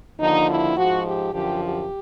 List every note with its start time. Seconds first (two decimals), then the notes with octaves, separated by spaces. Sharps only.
0.20 D#2 D3 F3 D#4
0.49 E4
0.76 G#2 F3 F#4
1.04 G4
1.33 F#2 D3 F3 G4
1.62 G4